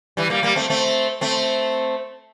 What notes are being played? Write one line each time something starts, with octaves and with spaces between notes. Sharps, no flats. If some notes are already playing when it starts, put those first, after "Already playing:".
E3 G3
G3 A#3
G3 A#3
A3 C4
A3 C4
A3 C4